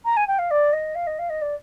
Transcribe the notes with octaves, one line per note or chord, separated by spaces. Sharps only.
A#5
G#5
G5
F5
D5
D#5
F5
D#5
F5
D#5
D5